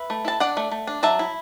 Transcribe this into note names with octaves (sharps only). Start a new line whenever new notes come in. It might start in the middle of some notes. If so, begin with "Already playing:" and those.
Already playing: B4 E5
A3
E4 A5
D4 D5 F#5
A3
A3
D4
F#3 E5 A5
E4